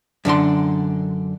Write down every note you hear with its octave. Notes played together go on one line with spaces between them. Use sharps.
F#2 D3 D4 C6